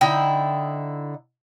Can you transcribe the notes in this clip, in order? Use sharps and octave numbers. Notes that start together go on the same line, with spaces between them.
D3 D#4 E4 G5